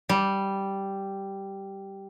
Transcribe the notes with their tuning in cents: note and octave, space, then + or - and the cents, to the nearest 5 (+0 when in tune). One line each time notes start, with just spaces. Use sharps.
G3 -5